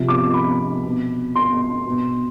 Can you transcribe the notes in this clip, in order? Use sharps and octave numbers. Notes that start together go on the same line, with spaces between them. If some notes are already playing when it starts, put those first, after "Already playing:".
Already playing: C3 F3
D6
B5
B2
C6
B2